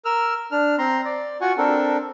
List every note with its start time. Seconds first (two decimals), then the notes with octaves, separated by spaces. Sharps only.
0.05 A#4 E6 F6
0.52 D4 F6
0.79 C4 A#5 C6
1.05 D5
1.41 F4 F#4 F#5 G#5 C#6
1.57 C4 D4 A4 A#4